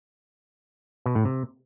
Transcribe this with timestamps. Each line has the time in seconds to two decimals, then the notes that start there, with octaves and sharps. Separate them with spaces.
1.06 B2
1.15 A2
1.25 C3